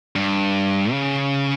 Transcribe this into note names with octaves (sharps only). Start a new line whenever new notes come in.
G2
C#3